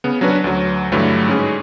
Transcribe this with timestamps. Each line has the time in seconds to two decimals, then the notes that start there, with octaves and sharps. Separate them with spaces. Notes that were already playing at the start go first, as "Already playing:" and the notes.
0.04 C#3 B3
0.21 F#3 C#4 D4 F#4 B4
0.44 D2 F#3
0.92 G2 D3 E3 F#3 G3 A3
1.28 G#2 C#4 G#4